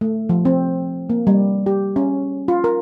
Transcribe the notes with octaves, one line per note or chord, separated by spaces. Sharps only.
A3
F3
C4
A#3
G3
G4
C#4
F4
A#4